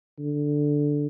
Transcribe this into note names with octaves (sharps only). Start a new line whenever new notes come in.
D3